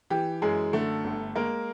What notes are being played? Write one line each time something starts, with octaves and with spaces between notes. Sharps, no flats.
E3 G4
F#2 G#3 G#4
D3 A3 A4
G1
G#3 A#3 A#4